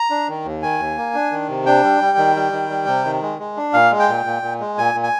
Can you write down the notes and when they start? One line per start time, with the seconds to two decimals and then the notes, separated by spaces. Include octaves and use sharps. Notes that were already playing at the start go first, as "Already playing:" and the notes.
Already playing: A#5
0.10 D4
0.28 D#3
0.45 D#2
0.63 D#3 G#5
0.79 D#2
0.97 A#3
1.14 D4
1.32 D#3
1.49 C3
1.66 D4 G5
1.84 G3
2.01 G3
2.18 D#3
2.36 G3
2.52 D#3
2.70 G3
2.87 C3
3.05 D#3
3.22 G#3
3.39 G#3
3.57 D4
3.73 A#2 F5
3.91 G#3
3.99 G5
4.09 A#2
4.25 A#2
4.42 A#2
4.60 G#3
4.78 A#2 G#5
4.94 A#2
5.04 G#5